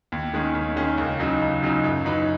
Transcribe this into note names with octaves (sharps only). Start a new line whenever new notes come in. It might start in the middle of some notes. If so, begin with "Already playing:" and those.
D#2
D#3 G#3 C#4
D#2
D#3 G#3 C#4
C#2
C#3 F#3 D#4
C#2
C#3 F#3 D#4
F#2
F#3 D#4 B4